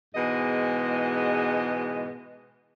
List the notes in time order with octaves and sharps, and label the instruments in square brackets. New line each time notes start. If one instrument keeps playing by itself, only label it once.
[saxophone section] G#2 B2 E3 G#3 D#5